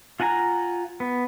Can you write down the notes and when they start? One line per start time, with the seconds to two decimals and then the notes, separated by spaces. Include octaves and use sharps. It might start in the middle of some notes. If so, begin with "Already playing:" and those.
0.20 F4 F#5 G#5 A#5
1.00 B3